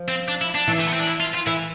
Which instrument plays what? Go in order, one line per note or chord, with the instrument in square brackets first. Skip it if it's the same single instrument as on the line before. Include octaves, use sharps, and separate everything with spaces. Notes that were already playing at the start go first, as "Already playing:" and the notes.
Already playing: [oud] F3
[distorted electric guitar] C4
D4
E4
D4
[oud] E3
[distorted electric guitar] A3
B3
C4
D4
E4
F4
F4
[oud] E3 [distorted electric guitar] E4